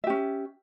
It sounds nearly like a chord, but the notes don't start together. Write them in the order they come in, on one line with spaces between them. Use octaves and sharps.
E5 G4 C#4